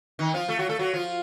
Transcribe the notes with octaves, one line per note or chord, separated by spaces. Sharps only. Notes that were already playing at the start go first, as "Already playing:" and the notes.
D#3 D#4
F3 F4
A3 A4
F#3 F#4
A3 A4
F#3 F#4
F3 F4